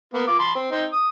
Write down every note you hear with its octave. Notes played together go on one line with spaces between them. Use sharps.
A#3 B3
F4 D6
A5 B5 C6
C4
C4 D#4 G5
D#6